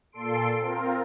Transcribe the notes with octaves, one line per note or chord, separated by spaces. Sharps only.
A#2 A4 C6 D7
C4 F4 A#4